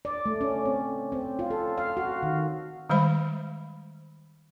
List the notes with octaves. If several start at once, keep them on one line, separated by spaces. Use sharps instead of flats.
D5
A3
C#4
C4
C4
F4
A4
F5
F#4
D#3
D#3 G3 G#3 C5 F5 B5